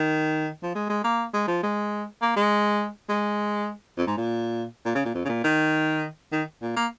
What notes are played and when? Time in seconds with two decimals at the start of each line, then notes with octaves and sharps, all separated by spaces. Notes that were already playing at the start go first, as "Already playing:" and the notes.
Already playing: D#3
0.63 F3
0.75 G#3
0.89 G#3
1.04 A#3
1.34 G#3
1.48 F3
1.63 G#3
2.22 A#3
2.36 G#3
3.09 G#3
3.98 F2
4.07 G#2
4.17 A#2
4.85 A#2
4.95 C#3
5.05 A#2
5.15 F2
5.25 C#3
5.29 A#2
5.44 D#3
6.32 D#3
6.62 A#2
6.76 A#3